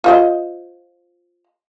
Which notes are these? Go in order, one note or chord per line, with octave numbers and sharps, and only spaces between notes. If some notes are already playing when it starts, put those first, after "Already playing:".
F4 C5 D#5